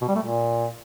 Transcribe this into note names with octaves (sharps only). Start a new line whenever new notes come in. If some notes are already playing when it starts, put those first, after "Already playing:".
B2
G3
A3
A#2